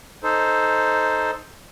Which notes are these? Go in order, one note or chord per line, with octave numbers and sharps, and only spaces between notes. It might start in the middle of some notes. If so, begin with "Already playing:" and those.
D#4 A4 C5